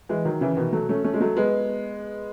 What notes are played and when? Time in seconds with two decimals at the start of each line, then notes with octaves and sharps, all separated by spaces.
0.09 E3 G#3
0.25 D#3 F#3
0.41 C#3 E3
0.57 B2 D#3
0.73 F#3 A3
0.89 A3 C#4
1.04 A3 C#4
1.14 G#3
1.21 F#3 A3
1.37 G#3 B3